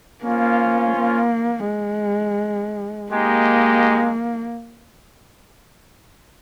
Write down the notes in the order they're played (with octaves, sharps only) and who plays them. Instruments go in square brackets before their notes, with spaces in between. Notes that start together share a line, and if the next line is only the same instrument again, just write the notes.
[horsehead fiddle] A#3 [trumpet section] C#4 F4 C5
[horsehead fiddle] A#3
G#3
[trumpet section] G#3 D#4 G4 [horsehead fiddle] A#3